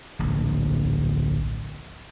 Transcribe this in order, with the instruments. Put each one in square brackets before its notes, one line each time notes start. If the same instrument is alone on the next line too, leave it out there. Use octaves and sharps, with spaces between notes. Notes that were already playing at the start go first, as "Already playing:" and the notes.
[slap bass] D1 A#1